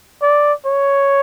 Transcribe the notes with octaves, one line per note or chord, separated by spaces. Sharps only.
D5
C#5